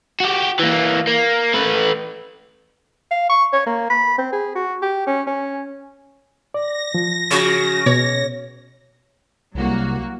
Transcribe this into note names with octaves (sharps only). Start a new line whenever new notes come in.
F#4 G4
E3 A#3
A#3
A3 B4
F5
C#6
C#5
A#3
B5
C4
G#4
F#4
G4
C#4
C#4
D5 A#6
F3
C#3 F#4
B2 C#5
C2 F#3 A#3 F#4